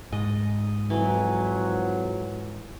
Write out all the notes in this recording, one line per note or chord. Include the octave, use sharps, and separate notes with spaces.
G#2 D#5
F2 E3 F#3